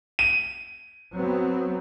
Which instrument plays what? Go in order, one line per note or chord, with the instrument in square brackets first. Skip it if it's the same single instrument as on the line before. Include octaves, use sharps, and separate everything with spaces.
[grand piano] D#7
[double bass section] F#3 B3 C4